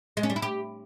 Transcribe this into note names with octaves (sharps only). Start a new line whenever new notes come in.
G#3
C#4
G3
E4
G4